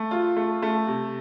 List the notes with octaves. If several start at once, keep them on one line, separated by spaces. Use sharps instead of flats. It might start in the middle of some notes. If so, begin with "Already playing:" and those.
Already playing: A3
F4
A3
A3
C3